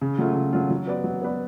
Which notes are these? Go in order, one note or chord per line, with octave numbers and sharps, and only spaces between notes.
C#3
F#3 A3 F4
C#3
F#3 A3 F4
F#3
B3 F#4 B4 D5
F#3
B3 F#4 B4 D5